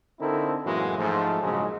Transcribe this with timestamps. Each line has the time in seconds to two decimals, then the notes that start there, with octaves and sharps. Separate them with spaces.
0.21 D3 C4 D#4 E4 A4 A#4
0.65 F#2 A2 E3 G#3 A#3 F#4
0.98 G#2 F3 A3
1.43 A#1 G#2 C#3 F#3 G#3